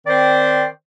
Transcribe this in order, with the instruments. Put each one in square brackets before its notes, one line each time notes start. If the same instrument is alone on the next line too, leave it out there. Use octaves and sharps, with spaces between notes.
[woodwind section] D#3 C4 C5 D5